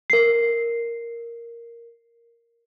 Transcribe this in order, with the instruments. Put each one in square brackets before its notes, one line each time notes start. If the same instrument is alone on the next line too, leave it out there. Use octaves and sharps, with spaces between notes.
[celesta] A#4 C7